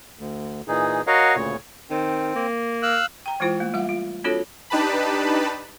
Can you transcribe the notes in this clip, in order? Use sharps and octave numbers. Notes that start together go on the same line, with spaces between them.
D2
A#2 E3 D#4 G#4
F#4 A#4 C#5 D#5 F5 F#5
D2 A#2 C#3 C#5
D#3 C4
A#3
F5 E6 F#6
G5 A#5
E3 G#3 E4 F4 C5 G5
A3 A#3
G3 F4 F5 F#5
F4
C4 D4 F4 F#4 A4 C#5
D4 D#4 G4 B4 A5 B5